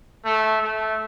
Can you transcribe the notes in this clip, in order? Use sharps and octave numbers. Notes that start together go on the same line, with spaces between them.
A3
A3